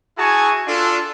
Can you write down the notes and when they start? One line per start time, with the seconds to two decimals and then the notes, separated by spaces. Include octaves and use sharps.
0.18 E4 F#4 G#4 G#5 A5 C#6
0.68 D4 F4 A4